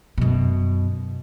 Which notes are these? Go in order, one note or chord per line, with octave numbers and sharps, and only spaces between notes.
F#2 B2